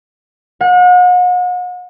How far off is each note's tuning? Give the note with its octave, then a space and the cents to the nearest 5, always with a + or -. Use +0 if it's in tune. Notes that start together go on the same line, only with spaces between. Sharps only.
F#5 -40